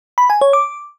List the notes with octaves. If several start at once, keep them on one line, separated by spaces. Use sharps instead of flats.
B5
G#5
C#5
D6